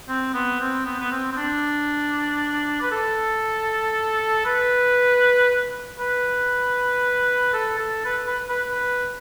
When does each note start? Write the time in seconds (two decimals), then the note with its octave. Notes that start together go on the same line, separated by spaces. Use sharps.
0.08 C4
0.34 B3
0.61 C4
0.86 B3
1.00 B3
1.12 C4
1.32 C4
1.37 D4
2.82 B4
2.92 A4
4.45 B4
5.99 B4
7.54 A4
7.79 A4
8.05 B4
8.27 B4
8.49 B4
8.71 B4